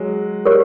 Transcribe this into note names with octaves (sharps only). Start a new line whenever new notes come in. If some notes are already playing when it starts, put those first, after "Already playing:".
Already playing: F#3 G#3
G4 A#4 C#5